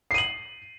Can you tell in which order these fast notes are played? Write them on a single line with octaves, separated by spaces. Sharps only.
C7 D#7 F#7